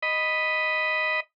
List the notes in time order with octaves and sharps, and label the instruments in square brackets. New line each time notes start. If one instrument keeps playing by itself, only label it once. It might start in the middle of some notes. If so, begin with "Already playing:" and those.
[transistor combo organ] D#5 B5